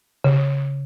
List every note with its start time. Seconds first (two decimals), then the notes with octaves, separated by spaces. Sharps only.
0.24 C#3